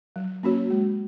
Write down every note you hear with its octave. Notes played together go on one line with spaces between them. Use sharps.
F#3
A#3 C#4 F#4 C#5
G#3